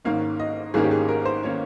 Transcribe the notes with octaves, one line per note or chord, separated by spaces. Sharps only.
G#1 G#2 D#3 A#3 C#4 F5
D#5
G#1 G#2 D#3 A#3 C#4 G#4
G4
G#4
A#4
C5
D#3 A#3 C#4 C#5